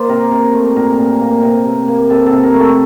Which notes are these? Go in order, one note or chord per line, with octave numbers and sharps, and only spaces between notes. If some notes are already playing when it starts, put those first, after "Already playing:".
Already playing: A#3 C5 D5
C3 A#4
C3
A3
A#2 A#4
A#2
A#3
C3
C3
A#3
C3 A4
A4
C3
A#4
A3
A4